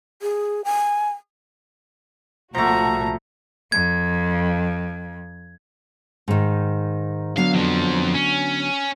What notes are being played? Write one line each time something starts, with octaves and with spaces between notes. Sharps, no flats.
G#4
G#5
C2 A#2 F3 A3 F#4 A#5
F2 G#6
G#2 D#3
D3 F#3 B3 F5
F2 F3
C#4